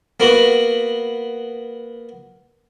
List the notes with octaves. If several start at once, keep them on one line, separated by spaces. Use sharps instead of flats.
A#3 B3 F#4